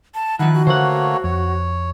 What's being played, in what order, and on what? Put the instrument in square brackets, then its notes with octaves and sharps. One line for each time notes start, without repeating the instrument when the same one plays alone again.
[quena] A5
[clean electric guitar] D#3 F3 [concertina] E4 F#6 [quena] F#5
[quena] F#4
[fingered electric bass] D3 [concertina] A3 A#3 C#5 [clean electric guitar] C5 F#5
[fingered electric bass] F2 [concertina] C#5